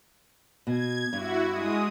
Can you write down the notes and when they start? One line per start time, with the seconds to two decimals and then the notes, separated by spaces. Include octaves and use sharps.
0.67 B2 G#6
1.13 G2 E4 F#4
1.51 G#3 D#6